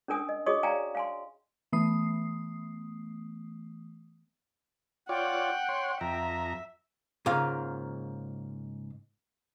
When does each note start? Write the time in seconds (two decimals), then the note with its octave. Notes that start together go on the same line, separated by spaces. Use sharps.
0.08 C#4 D4 A#4 G#5 D#6
0.29 D#5
0.46 F#4 G#4 C#5 D#5 C#6 D#6
0.63 D5 F5 G5 G#5 A#5
0.95 F5 G#5 C6
1.73 E3 A3 B3 D#6 C7
5.09 F4 C#5 D5 F#5 G5
5.69 C#5 C6
6.01 F2 E5 A#5
7.26 G#2 C#3 A#3 F4 F5